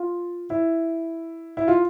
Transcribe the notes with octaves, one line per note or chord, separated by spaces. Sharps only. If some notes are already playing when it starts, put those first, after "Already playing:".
Already playing: F4
E4
E4
F4